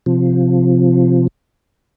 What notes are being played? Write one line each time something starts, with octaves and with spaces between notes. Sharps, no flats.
C3 F3